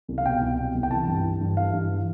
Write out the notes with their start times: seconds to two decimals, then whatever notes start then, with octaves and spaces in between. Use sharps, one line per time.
0.08 C2
0.18 F5
0.26 B2 G5
0.42 C2
0.59 B2
0.75 C2
0.83 G5
0.91 E3 A5
1.07 G2
1.24 E3
1.41 G2
1.57 E3 F5
1.73 G2
1.89 E3